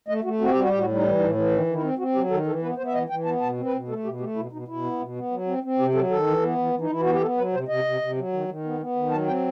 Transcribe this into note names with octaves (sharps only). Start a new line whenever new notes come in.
A3 D#5
A3 F#4
C4 F#4
G4
G3 F#4
A2 G4
F#4
G3
D#4
E3 E4
A2 D#4
E3
D#3
D#3
E4
C4
C4 F#4
F#3 G4
D#3 A4
E3 A4
B3 B4
B3 C5
E5
E3 D#5
E3 G5
B3 A5
B2 A5
C4
B4
B2
A3 A4
B2 G4
A3 G4
B2 E4
B2 D#4
B2 E4
B3
B2
B3
F#3
C4
C4
C3 G4
F#3 A4
D#3 A4
E3
B3
E3
E3
D#4
E3 E4
F#4
B3
G4
B3 A4
F#3 B4
C3 C5
C3 D#5
C3
C3
F#3
D#3
D#3
B3
B3
D#3
F#3 A5
C4 G5